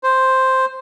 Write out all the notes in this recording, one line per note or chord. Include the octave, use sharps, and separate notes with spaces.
C5